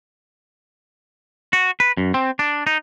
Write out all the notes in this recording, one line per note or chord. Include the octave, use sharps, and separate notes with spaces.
F#4
B4
F#2
C4
D4
D#4